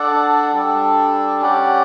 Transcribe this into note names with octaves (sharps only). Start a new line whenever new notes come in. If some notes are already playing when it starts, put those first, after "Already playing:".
Already playing: D4 A4 D5 F#5
G3 D4 A4
C#4 G4 D5 F#5